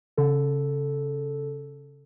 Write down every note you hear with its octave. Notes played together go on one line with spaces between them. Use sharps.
C#3 A4